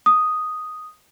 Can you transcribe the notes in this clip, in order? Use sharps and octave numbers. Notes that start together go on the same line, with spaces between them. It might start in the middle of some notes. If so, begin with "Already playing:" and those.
D#6